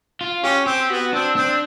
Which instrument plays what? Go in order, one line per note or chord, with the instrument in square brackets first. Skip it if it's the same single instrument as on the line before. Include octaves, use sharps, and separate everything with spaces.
[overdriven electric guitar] F4
[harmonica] C#4 [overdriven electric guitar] G4
[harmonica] C4 [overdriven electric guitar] G4
[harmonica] B3 [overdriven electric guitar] F#4
[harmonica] C4 [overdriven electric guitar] D4
[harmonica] C4 [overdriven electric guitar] D4